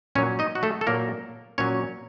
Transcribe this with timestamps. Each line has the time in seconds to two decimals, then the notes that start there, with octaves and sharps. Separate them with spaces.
0.15 A#2 F#3 C#4 C#5
0.39 D#4 D#5
0.55 F#4
0.63 A3 A4
0.81 A4
0.87 A#2 F#3 A#3 A#4
1.58 A#2 F#3 C#4 C#5